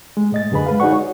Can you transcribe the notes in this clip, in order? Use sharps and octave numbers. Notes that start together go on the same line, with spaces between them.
G#3
A2 D#5 A6
F#2 D3 G#4 B4 B5
G#3 B4 F5
D#4 F#4 G#4 D5 F#5 C#6
C#5